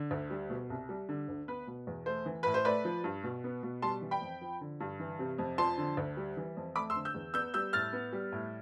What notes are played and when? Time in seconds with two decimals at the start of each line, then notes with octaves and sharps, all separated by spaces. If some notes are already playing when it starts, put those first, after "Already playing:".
Already playing: D3
0.11 D2
0.30 G3
0.50 B2
0.70 C2
0.89 G3
1.09 D3
1.28 D2
1.48 B3 B4
1.67 B2
1.87 E2
2.06 A3 C5
2.26 E3
2.43 A2 B4
2.54 C5
2.65 A3 B4 D5
2.85 F3
3.04 G2
3.24 B2
3.44 B3
3.63 B2
3.82 G3 A5 C6
4.02 E3
4.11 G5 B5
4.21 F2
4.41 F3
4.61 D3
4.80 G2
5.00 E3
5.19 C3
5.38 F2
5.58 F3 A5 C6
5.78 D3
5.97 D2
6.17 G3
6.37 E3
6.57 F2
6.76 A3 B5 D6
6.90 C6 E6
6.96 D3
7.05 E6 G6
7.15 E2
7.34 B3 E6 G6
7.54 G3 E6 G6
7.73 A2 F6 A6
7.93 B3
8.13 G3
8.32 A2